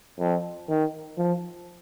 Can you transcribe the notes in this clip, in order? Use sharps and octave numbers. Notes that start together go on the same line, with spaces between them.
F2
D#3
F3